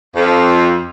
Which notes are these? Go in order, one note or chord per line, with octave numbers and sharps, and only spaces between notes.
F2